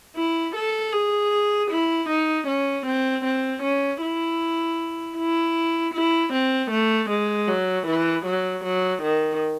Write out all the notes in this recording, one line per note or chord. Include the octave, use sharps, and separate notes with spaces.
E4
A4
G#4
E4
D#4
C#4
C4
C4
C#4
E4
E4
E4
C4
A3
G#3
F#3
E3
F#3
F#3
D#3